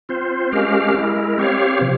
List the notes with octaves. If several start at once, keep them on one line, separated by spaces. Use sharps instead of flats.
C4 F4 C5
G#3 C#4 G4 A#4 F5
G#3 E4 A#4
C4 G4 C#5 F5
C3 F3